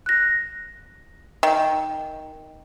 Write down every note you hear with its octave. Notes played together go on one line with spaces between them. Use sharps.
F#6 A#6
D#3 G5